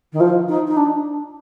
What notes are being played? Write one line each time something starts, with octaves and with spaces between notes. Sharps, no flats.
D#3
F3
D#4
D#4
D4